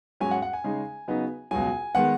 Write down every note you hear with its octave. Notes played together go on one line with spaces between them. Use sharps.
G#2 F#3 C#4 G#5
F#5
F#5
G#5
C#3 G#3 D#4
C#3 F#3 B3 D#4
C#2 B2 F#3 G#5
D#3 G#3 B3 F#5